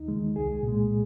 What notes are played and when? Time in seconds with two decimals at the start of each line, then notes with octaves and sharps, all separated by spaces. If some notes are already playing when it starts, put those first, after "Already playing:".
Already playing: D#2 D#4
0.08 D#3 G#3
0.35 C2 G#4
0.63 A#2
0.68 G#3